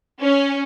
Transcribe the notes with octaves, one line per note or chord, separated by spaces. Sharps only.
C#4